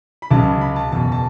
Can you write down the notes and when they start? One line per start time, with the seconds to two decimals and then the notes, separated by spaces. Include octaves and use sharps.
0.22 B5
0.31 C#2 C#3 F#3 A5
0.61 B5
0.76 A5
0.92 F#1 E2 B2 A5
1.12 A5